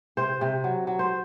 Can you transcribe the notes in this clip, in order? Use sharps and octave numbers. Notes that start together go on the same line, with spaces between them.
C3 C5
C3
F#3
F#3
C5